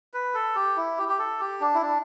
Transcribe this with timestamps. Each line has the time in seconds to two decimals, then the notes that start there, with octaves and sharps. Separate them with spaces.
0.14 B4
0.34 A4
0.56 G4
0.77 E4
0.98 G4
1.09 G4
1.19 A4
1.40 G4
1.61 D4
1.74 E4
1.82 D4